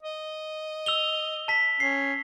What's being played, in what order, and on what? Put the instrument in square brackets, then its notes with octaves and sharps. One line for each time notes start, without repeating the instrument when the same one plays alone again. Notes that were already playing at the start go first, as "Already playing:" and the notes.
[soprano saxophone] D#5
[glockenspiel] E6 F7 G7
A5 B6
[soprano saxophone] C#4 [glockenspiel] C7